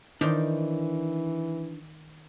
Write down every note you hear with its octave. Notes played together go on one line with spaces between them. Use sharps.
D#3 E3 D4 C5 D5